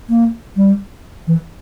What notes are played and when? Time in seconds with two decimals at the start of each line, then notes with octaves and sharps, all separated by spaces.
0.10 A#3
0.57 G3
1.27 E3